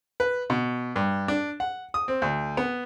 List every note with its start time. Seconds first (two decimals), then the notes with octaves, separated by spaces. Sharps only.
0.20 B4
0.50 B2
0.96 G2
1.28 D4
1.60 F#5
1.94 D#6
2.08 C4
2.22 D2
2.57 B3